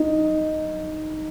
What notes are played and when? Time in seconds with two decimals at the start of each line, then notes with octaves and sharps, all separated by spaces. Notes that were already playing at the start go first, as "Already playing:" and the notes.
Already playing: D#4